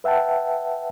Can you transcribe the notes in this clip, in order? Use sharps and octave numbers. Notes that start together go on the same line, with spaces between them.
B4 E5 F#5 G5 A5